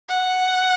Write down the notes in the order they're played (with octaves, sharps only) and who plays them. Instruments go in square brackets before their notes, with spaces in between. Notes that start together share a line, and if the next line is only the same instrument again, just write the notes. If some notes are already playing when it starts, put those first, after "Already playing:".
[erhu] F#5